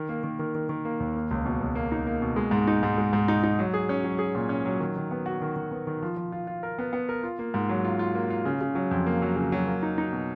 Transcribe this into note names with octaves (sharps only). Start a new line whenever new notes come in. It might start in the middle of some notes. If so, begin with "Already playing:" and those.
Already playing: D#3
A#3
D#3
D#3
D#3
D#3
A#3
D#2
A#3
C#2
B2
C#2
A#3
D#4
A#3
B2
G#3
G#2
D#4
G#2
G#3
G#2
D#4
D#4
F#3
G#4
C#4
F#3
G#4
A#2
C#4
F#3
D#3
D#3
B3
F#4
D#3
D#3
B3
D#3
F3
F3
F4
F4
A#4
B3
B3
A#4
F4
A#3
G#2
F#3
F4
F4
A#3
F4
C#3
C#3
F#3
F2
A#3
F#3
C#3
F#3
A#3
D#4
D#4
B2